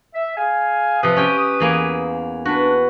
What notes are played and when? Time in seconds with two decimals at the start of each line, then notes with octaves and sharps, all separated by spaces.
0.15 E5
0.38 G#4 F5 G#5
1.03 C3 F3 B4 D#6
1.16 C#4 G4 G5
1.60 E2 A#3 G#5
2.45 D4 F#4 B4